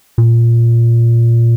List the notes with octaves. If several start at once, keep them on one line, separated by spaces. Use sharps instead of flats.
A#2